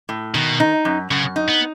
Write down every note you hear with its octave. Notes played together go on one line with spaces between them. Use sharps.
A2
B2 D#3
D#4
F#2
F#2 C#3
D#4
B3